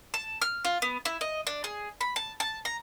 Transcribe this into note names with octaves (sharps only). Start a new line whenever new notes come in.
A5
F6
F4
B3
E4
D#5
D4
G#4
B5
A5
A5
A#5